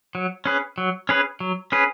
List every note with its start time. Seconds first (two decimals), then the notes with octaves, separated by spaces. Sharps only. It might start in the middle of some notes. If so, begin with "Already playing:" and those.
0.15 F#3
0.46 C#4 G#4 B4
0.78 F#3
1.09 C#4 G#4 B4
1.40 F#3
1.72 C#4 G#4 B4